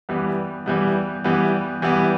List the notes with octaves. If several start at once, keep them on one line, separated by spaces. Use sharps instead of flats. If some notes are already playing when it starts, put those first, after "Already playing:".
E3 G3 B3
E3 G3 B3
E3 G3 B3
E3 G3 B3